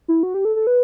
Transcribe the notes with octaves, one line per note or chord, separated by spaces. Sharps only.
E4
F#4
G4
A4
A4
B4